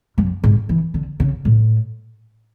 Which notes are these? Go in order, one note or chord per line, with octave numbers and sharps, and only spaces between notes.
F#2
G#2
E3
D3
C#3
A2